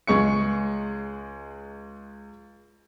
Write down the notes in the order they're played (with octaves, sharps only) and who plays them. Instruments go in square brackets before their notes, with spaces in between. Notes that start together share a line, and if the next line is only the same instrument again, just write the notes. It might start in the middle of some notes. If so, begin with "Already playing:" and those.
[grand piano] C#2 G#3 C#6 C#7